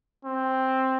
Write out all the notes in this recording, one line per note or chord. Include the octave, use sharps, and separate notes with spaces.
C4